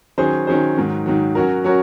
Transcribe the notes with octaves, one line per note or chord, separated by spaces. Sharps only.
D#3 F#3 C#4 G#4 C5
D#3 F#3 C#4 G#4 C5
G#2 D#3 F#3
G#2 D#3 F#3
F#3 C#4 F#4 A#4
F#3 C#4 F#4 A#4